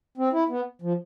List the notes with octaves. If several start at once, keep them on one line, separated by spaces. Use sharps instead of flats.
C4
E4
B3
F3